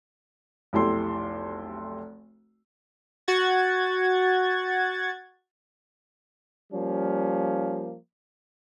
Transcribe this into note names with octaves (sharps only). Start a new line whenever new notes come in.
F1 B1 E4 G4 A4 C6
F#4 F#5 G#6 A6
F3 G3 A#3 C#4